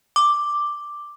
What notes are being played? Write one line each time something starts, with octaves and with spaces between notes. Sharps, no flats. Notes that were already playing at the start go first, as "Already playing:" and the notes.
D6